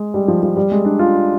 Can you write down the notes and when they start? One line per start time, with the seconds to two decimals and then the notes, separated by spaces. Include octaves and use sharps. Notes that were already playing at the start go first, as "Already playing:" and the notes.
Already playing: G#3
0.14 G3
0.28 F3
0.43 F3
0.57 G3
0.71 G#3
0.85 D4
0.99 F4